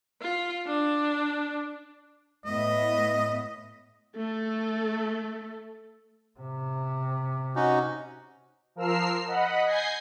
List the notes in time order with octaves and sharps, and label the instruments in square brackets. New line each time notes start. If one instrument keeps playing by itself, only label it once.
[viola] F4
D4
[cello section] A2 B3 E5 [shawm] D#5
[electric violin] A3 A4
[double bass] C3
[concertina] C#4 D#4 F#4
[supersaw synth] F3 A#4 E6 F6 C7
D#5 F#5 B5
G#5 G6 G#6 A#6 C7